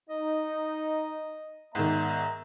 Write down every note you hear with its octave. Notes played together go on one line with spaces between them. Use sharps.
D#4 D#5
G#2 D#3 B3 D5 E5 A#5